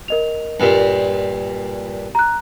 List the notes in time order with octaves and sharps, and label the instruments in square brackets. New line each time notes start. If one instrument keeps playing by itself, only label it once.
[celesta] A#4 D#5 F7
[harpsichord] G2 A#2
[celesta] A#5 F#6